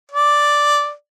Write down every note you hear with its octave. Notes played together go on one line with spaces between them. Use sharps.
D5